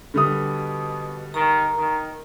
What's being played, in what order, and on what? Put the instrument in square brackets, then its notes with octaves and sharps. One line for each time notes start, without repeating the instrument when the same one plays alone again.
[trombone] B2 [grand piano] D3 G3 D#6
[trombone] D#3 [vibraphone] A#5
[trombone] D#3